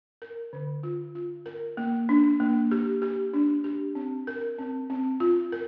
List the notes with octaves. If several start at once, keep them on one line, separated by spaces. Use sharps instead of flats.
A#4
D3
F4
F4
A#4
A#3
D4
A#3
G4
G4
D4
G4
C4
A#4
C4
C4
F4
A#4